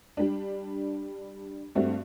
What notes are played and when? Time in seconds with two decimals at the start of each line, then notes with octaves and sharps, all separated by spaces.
0.17 G3 D4
1.75 G2 A3 C4 D4 F#4